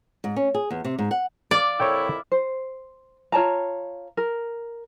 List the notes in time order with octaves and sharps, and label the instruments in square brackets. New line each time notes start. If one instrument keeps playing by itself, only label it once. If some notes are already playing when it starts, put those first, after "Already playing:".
[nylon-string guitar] G#2
C#4
G#4
E2
C3
G#2
F#5
[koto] D5 [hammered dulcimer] F5 D6
[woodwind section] F2 A#2 E4 [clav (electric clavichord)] C#5 G5
[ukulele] C5
F4 C#5 A5 A#5
A#4